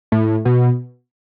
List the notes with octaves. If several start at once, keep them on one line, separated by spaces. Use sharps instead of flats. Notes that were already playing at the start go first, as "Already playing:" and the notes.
A2
B2